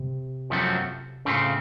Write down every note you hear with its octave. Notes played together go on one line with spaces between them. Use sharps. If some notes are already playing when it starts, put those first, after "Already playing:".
Already playing: C3
F#2 F3 A3 C4 F#4
A2 C#3 A3 C4 F4